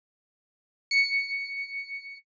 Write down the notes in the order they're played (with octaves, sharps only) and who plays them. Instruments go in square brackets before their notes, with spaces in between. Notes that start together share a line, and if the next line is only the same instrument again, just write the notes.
[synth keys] C#7